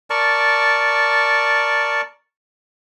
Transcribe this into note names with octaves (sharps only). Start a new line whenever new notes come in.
A#4 D5 A5 C#6